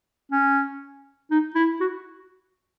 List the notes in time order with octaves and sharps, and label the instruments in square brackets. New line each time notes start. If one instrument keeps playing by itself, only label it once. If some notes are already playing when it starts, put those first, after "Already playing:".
[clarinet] C#4
D#4
E4
F#4